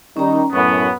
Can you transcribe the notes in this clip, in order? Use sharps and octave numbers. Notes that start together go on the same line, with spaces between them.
D#3 G3 C#4 D#4 A#5
F#2 A2 B3 C#6